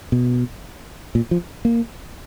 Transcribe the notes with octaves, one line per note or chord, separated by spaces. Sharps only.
B2
A#2
F3
A#3